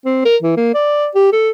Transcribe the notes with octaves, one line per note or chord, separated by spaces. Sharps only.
C4
A#4
E3
A#3
D5
G4
A4